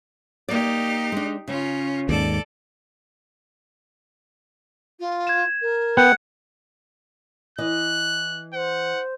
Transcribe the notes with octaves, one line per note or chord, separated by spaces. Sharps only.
A#3 D#4 G4 D5
G#3 D4
C#3 C#4 F4
D#2 G#2 A4 D5
F4
G#6 E7
A#4
B3 F#5 G5
E3 D#5 F#6
C5 F#5